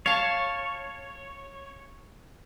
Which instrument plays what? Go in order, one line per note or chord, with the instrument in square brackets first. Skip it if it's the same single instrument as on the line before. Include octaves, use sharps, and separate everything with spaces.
[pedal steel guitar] C#5 [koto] F5 A5